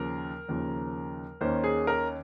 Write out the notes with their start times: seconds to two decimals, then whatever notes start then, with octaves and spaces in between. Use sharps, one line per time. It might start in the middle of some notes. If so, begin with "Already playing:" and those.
Already playing: D#2 C#3 F3 A#4
0.49 D#2 C#3 F3
1.41 D#2 D#3 A#3 C#4 C5
1.64 G#4
1.87 A#4